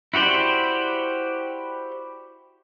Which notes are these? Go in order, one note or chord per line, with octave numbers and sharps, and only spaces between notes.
E4 F#4 G4 C5 D5